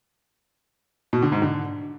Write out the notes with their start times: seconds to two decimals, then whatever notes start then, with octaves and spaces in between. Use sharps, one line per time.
1.13 B2
1.23 D3
1.32 G#2
1.42 D3